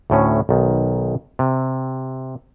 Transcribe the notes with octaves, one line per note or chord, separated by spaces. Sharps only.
D2 A2 C#4
B1 D#3
C3